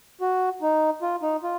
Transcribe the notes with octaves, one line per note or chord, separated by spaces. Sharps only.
F#4
D#4
F4
D#4
F4